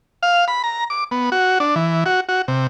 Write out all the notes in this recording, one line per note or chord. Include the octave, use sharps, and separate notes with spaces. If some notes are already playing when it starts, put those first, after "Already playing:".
F5
B5
A#5
D6
B3
F#4
D4
E3
F#4
F#4
C3